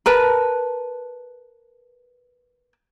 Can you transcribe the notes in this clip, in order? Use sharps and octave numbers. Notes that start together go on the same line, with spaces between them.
A#4 B4 A5